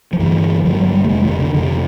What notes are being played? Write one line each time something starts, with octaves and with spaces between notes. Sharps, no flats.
F3
G2 D3 E3
G2 D3 F3
F#3
G3
A3
F2 C3 G#3
D#3
D3
F2 C3 D#3